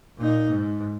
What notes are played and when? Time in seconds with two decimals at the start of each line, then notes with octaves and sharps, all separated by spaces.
0.17 A#2 D#4
0.49 G#2